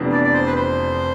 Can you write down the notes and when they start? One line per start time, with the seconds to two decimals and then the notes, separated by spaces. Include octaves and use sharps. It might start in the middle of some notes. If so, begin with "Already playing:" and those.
Already playing: F1 F2 E3 B3 D4
0.12 D5
0.24 D5
0.33 C5
0.46 B4
0.55 C5